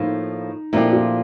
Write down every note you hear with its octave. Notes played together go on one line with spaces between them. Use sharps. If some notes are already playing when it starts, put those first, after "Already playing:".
Already playing: A2 F3 A#3 D#4
A#2 F3 A3 D4 E4 G4
F4